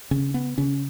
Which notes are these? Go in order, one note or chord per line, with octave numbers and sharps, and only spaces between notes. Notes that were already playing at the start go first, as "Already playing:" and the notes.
C#3 C#4
B3
C#3 C#4